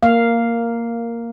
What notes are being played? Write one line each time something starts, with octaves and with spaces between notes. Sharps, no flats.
A#3 F5